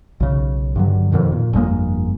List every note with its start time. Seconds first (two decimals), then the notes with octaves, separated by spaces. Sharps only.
0.20 B1 C#3
0.76 G2 D3 F#3
1.11 F2 G#2 B2 D#3
1.32 A#2
1.53 G1 F2 G#3 A#3